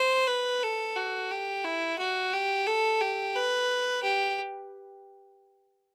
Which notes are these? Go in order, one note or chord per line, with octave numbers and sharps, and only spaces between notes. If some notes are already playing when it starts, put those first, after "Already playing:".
Already playing: C5
B4
A4
F#4
G4
E4
F#4
G4
A4
G4
B4
G4